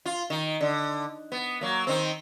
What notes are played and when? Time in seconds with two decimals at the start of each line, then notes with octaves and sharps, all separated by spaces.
0.05 F4
0.30 D#3
0.61 D3
1.32 B3
1.61 F#3 A#3
1.87 D#3 C4